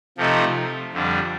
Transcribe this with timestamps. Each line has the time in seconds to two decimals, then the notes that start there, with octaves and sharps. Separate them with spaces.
0.18 C3 F3 A3 D#4
0.93 F2 D3 G3